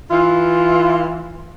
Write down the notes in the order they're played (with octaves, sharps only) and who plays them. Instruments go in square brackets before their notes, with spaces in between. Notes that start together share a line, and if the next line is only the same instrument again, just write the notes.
[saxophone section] E3 F4